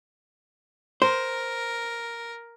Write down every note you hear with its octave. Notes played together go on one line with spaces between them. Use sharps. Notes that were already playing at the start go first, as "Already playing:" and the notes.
A#4 C5